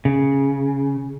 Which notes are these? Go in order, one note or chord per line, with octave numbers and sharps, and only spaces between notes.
C#3